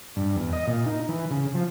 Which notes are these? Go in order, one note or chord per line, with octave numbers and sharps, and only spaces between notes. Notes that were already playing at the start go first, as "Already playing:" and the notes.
G2
E2
D#5
A#2
D#4
E3
C#3
F3